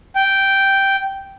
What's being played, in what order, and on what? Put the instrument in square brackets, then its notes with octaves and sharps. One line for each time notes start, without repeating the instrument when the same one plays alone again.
[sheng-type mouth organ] G5